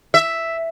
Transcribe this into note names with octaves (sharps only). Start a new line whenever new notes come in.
E5